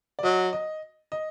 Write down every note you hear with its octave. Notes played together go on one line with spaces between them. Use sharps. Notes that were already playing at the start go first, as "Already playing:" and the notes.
D5
F#3 D#5
D#5
D#5